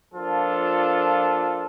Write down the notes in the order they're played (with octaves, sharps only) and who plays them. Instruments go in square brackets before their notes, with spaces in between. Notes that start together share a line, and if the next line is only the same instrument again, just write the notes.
[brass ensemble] F3 A#3 D4 F4 A4